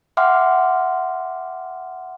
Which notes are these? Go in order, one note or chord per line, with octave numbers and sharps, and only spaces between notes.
E5 F#5 G5 C6 D6 F6